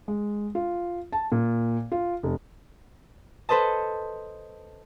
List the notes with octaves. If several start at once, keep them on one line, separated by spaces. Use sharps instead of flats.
G#3
F4
A5
A#2
F4
F1
A4 B4 C5 D#5 A5